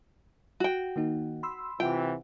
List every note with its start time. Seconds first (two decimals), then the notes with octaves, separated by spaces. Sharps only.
0.60 F#4 G5
0.96 D#3 A#3 D#4
1.43 B5 C6 E6
1.80 C3 E3 F4 E5 F#5 G5